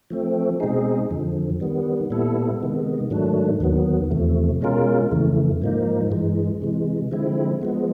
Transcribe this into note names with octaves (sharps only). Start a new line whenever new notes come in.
F3 A3 C4
B2 G#3 C4 D#4 G#4
F2 D3 F3
D#3 G3 B3
A#2 G3 B3 E4 A4
C3 D#3 G#3 B3
G#2 D#3 F#3 A3 D4
D#2 D#3 F#3 B3
E2 C3 F3 A3
B2 G#3 C#4 F4 A#4
F2 C#3 E3 A3
G#2 F3 A#3 D#4
G2 E3 G#3
C3 E3 G#3
D3 F3 G#3 C4 E4
F3 G#3 B3